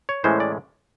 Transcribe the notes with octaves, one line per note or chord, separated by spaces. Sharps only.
C#5
A2 E3 G#3 C#4 C5
D5